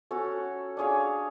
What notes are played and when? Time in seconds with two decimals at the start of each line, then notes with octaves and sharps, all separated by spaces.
0.11 C#4 F#4 A4 C#5
0.77 D4 G#4 C#5 F5